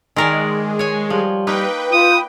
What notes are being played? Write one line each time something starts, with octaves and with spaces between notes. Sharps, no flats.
D#3 G#3 A#4 D5
C#5 G#5
F3 G3
A#3 D#4 B4 G5
F4 D#6